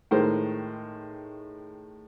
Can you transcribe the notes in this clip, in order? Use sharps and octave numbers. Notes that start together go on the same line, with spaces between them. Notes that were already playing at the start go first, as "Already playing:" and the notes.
A2 D#3 G#3 A#4 C5